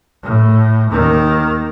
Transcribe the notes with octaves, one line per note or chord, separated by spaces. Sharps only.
A2
D#2 D#3